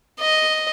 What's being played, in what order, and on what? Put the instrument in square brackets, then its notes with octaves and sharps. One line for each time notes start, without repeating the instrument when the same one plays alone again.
[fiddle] D#5